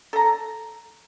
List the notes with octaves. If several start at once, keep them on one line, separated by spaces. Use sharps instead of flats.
A4 A#5